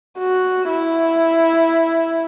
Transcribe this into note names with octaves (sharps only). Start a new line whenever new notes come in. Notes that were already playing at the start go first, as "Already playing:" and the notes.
F#4
E4